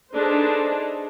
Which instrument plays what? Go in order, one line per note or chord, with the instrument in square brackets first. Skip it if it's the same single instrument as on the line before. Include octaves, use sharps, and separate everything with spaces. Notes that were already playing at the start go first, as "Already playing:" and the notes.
[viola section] D4 D#4 G#4 A4 B4 C5